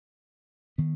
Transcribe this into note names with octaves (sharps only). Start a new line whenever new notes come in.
D#3 B3